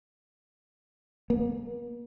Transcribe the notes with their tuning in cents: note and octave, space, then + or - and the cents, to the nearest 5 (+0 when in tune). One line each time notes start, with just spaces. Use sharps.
A#3 +45